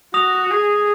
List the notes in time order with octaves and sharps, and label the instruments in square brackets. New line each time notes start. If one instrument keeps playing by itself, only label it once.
[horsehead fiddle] F#4 [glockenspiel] D#6 A#6 F7
[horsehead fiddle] G#4